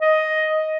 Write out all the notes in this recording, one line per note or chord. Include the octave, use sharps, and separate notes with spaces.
D#5